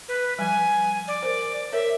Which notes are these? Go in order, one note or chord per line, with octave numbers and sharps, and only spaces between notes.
B4
F3 G3 G#5
D5
A#4 C5
A#4 C#5 E5